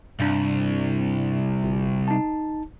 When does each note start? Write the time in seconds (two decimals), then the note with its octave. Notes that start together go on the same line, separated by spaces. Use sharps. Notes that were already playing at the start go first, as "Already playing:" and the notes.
0.20 C2 G2 D4
1.63 G1
2.08 D#4 A5